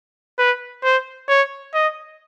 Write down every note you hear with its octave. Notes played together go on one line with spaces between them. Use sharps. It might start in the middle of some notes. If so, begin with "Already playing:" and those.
B4
C5
C#5
D#5